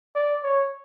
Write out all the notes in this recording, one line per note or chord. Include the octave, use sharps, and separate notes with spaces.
D5
C#5